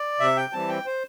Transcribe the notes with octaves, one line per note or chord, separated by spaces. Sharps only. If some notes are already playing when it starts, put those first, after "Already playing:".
Already playing: D5
C3 E5
G5
E3 G3 C4 A5
G5
C5